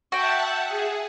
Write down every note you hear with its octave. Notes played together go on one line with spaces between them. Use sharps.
F#4 E5 F#5 G5 A5
G#4